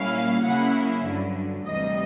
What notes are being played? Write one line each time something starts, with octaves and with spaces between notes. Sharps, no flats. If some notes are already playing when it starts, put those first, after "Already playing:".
Already playing: A#2 G3 A#3 C#4 E4 F5
C#3 F#3 A#3 C#4 E4 F#5
G2 D3 F#3
D2 C3 E3 G3 D#5